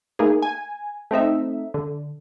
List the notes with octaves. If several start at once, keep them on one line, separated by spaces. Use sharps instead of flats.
A3 A#3 D#4 G#4
G#5
A3 C4 D#4 E5
D3